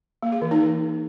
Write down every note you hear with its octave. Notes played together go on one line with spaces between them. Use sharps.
A#3
G#4
E3
D#4